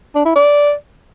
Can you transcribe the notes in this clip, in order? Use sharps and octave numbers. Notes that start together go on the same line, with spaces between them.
D4
E4
D5